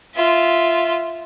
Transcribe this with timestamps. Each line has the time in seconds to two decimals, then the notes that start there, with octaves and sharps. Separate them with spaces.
0.15 F4 E5